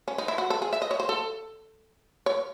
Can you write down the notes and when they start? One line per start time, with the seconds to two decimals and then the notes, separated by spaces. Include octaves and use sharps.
0.08 C#4
0.18 D#4
0.28 E4
0.38 F#4
0.50 A4
0.62 G#4
0.73 E5
0.82 D#5
0.91 C#5
1.00 C5
1.09 A4
2.26 C#5